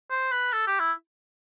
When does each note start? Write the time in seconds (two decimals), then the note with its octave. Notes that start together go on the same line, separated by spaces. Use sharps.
0.11 C5
0.32 B4
0.53 A4
0.67 G4
0.80 E4